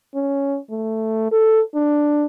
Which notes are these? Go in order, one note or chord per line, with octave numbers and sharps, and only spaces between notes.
C#4
A3
A4
D4